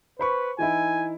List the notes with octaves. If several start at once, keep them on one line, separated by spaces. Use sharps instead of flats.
B4 C5 B5 C#6
E3 D#4 E4 G#5